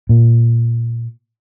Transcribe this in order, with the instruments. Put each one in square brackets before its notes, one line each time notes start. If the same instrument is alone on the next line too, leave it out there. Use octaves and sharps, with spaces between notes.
[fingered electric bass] A#2